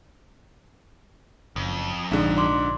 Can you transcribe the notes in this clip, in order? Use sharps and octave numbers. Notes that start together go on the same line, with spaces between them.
F#1 F2
A#1 G#2 D3
D5 C6 D6